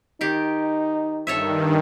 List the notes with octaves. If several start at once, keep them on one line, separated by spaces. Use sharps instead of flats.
D#3 D#4 G4
G2 D#3 A4 C#5 E5